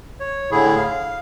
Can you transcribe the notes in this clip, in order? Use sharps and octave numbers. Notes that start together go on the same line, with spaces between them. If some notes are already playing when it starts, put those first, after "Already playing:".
C#5
A2 D3 E4 G#4
F5